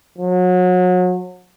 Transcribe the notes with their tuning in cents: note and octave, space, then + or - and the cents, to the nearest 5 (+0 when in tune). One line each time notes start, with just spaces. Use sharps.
F#3 -30